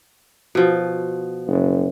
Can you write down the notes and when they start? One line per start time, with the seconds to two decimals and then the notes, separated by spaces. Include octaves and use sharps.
0.55 B2 F3
1.47 F#1